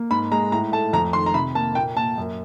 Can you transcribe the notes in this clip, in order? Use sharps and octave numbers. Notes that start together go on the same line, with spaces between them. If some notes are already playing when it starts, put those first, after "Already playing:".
Already playing: A#3
G#2 B5
G#3 A#5
A2 A#5
A3 A5
F2 A#5
D#3 C6
A#5
C3 B5
A#3 A5
A#2 G5
A#3 A5
F#2